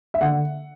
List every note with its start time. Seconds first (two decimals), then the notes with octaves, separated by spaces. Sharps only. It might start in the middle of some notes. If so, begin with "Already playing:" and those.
0.14 E5
0.21 D3 F#5